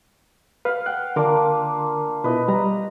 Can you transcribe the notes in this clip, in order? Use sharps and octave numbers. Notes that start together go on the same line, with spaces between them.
B4 F5 F#5
F#5 G5 F#6
D3 A#3 D4 F4 A#4 D6
B2 E4 F4 B4 D#5
G3 A#5